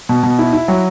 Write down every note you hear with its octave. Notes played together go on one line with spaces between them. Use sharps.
B2
B2
E4
E4
F#3